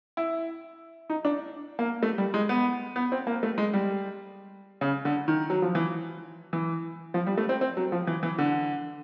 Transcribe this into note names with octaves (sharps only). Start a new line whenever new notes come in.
E4
D#4
D4
A#3
A3
G3
G#3
B3
B3
C4
A#3
A3
G#3
G3
C#3
D3
D#3
F#3
F3
E3
E3
F3
G3
A3
C4
C4
F#3
F3
E3
E3
D3